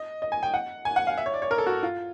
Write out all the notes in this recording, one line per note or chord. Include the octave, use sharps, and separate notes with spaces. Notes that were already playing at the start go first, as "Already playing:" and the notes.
Already playing: D#5
D#5
G#5
G5
F#5
G#5
F#5
F5
E5
C#5
D5
C#5
A#4
A4
F#4
F4